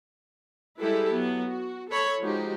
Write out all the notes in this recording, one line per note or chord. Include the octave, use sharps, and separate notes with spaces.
G3 G#3 E4 G4 A4 B4
F#3 B3
F#4
A4 C#5 B5
F3 G#3 D#4 F#4 G4